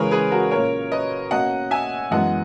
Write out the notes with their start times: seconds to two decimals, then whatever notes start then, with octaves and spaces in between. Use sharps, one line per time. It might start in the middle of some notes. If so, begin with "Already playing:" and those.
Already playing: C#3 E3 G#3 C#4 G#4 A#4 B4 C#5
0.11 G#4 B4
0.31 F#4 A#4
0.51 A#2 A#3 C#4 A#4 C#5
0.91 B4 D#5
1.31 B2 A#3 C#4 D#5 F#5
1.71 E5 G#5
2.11 F#2 E3 G#3 B3 D#5 F#5